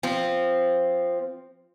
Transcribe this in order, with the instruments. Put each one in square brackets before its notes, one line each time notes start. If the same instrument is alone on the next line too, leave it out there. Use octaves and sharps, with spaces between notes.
[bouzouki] F3 C4